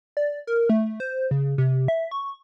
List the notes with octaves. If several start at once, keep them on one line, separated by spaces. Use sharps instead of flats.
D5
A#4
A3
C5
C#3
C3
E5
C#6